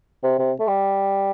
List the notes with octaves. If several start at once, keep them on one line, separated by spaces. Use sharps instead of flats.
C3
C3
A3
G3